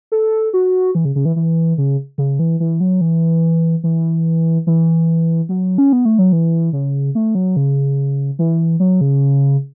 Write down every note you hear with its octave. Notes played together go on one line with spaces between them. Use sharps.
A4
F#4
E3
C#3
C#3
E3
E3
C#3
C#3
E3
E3
F#3
E3
E3
E3
F#3
C#4
B3
A3
F#3
E3
C#3
A3
F#3
C#3
E3
F#3
C#3